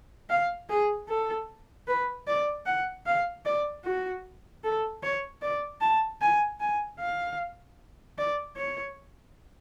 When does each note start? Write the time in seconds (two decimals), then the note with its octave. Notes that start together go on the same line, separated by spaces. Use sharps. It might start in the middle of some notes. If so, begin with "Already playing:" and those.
0.30 F5
0.70 G#4
1.09 A4
1.87 B4
2.27 D5
2.66 F#5
3.06 F5
3.46 D5
3.85 F#4
4.64 A4
5.03 C#5
5.42 D5
5.81 A5
6.21 G#5
6.60 G#5
7.00 F5
8.18 D5
8.57 C#5